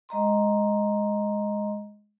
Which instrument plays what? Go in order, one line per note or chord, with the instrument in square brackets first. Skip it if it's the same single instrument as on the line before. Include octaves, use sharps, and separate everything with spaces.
[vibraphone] G#3 D#5 A#5 C6